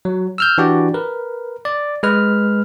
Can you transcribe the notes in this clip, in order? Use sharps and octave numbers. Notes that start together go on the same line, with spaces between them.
F#3
E6 F6 G6
E3 D4 F#4 G4 D5
A#4 B4
D5
G#3 B4 F6